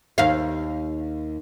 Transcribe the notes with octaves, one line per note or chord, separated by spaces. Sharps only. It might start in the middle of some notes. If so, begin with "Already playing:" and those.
D#2 F5